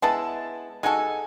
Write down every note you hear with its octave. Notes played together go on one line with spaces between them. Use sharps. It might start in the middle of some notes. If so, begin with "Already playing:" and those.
G#3 B3 E4 A5
G#3 D#4 F#4 A4 G#5